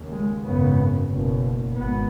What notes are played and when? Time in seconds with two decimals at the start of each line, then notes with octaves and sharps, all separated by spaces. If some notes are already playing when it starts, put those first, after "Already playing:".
Already playing: D#2 C#3
0.11 G#3
0.42 G#1 F#2 C#3 B3
1.08 F#1 E2 B2
1.73 G#1 G#2 B3